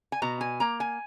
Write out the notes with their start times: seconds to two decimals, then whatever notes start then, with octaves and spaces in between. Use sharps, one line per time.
0.12 G#5
0.22 B2 A#5
0.41 G#5
0.60 A#3 A#5
0.80 G#5